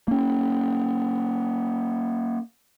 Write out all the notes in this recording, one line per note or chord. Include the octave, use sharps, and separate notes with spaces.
A#3 C#4